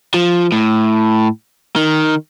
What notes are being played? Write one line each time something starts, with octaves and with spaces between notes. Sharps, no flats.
F3
A2
D#3